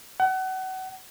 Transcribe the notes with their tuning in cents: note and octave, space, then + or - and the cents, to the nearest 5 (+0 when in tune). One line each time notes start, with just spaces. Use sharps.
F#5 +30